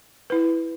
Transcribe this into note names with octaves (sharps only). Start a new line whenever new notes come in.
E4 B4